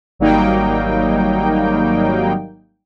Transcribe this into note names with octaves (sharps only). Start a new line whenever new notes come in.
G#1 F#3 G3 A#3 D#4 G5